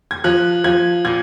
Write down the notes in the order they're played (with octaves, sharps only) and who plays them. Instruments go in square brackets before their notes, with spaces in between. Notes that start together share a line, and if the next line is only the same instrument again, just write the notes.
[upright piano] G#6
F3 F#6
F3 G#6
A#2 G#6